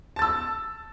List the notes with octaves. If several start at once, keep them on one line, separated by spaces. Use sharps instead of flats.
A5 E6 A6